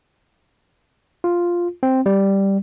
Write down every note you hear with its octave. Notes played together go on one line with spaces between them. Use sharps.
F4
C4
G3